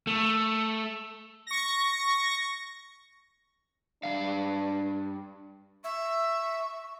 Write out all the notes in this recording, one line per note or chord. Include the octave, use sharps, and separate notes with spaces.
A3
C#6 A#6
G2 D#3 D4 F5
E5 C#6